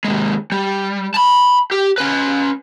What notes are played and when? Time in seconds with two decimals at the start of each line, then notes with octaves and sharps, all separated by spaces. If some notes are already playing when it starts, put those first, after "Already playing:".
0.05 D#2 G#3
0.52 G3
1.14 A5 B5
1.71 G4
1.98 C#4 B4